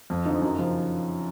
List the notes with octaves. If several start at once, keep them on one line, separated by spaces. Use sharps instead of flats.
F2
D3 F3 D#4
F#2
C#3 F3